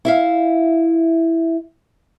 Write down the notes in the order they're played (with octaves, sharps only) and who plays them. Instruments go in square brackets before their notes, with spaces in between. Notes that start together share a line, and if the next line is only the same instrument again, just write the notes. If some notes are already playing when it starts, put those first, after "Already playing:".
[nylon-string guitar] E4 E5 F5